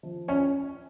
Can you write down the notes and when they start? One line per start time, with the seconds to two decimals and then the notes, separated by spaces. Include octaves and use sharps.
0.03 F3
0.28 C#4 C#5